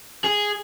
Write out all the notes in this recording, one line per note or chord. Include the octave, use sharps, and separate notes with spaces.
G#4